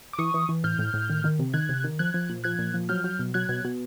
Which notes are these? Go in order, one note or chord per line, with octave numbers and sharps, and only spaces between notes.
D6
E3 C#6 D#6
E3
E3
A2 F6 G6
A2
A2
D#3
D#3
C3
D#3 F#6 G#6
C3
D#3
F3 F#6 G#6
F3
A#2
F3 F#6 G#6
A#2
F3
F#3 F6 G6
F#3
B2
F#3 F#6 G#6
B2
B2